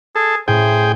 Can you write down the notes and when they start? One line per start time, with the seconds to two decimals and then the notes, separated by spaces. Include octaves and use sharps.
0.16 G#4 A4
0.48 A2 G#4 C5 G5